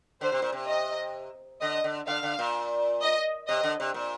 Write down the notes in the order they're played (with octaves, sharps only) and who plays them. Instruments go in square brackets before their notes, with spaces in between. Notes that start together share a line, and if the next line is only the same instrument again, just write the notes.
[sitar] D3 [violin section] C5
[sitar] C3
A#2
C3
[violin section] D#5
[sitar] D3 [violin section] D#5
[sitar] D3
[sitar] D3 [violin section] F5
[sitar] D3
A#2
[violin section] D#5
[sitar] C3 [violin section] D#5
[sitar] D3
C3
A#2